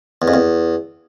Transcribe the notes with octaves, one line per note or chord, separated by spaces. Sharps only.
E2
F2
E2